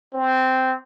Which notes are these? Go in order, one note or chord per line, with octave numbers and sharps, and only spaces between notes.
C4